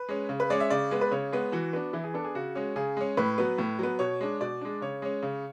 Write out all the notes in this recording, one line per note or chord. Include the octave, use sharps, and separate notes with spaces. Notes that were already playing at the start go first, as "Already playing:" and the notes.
Already playing: B4
G#3 C#4
C#3
B4
G#3 C#4 D5
E5
C#3 D5
G#3 B3
B4
C#3 C#5
G#3 B3
E3 F#4
B3 D4
E3 E4
G#4
B3 D4 A4
G#4
C#3 F#4
G#3 C#4
C#3 G#4
G#3 C#4
A2 B4
F#3 B3
A2
F#3 B3
B2 C#5
G#3 D4
B2 D5
G#3 D4
C#3 C#5
G#3 C#4
C#3